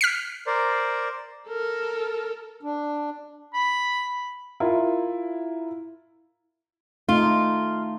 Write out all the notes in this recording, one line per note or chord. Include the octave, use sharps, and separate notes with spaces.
F6 B6 C7
A#4 C5 D5
A4 A#4
D4
B5
E4 F4 A#4
A3 D#4 F4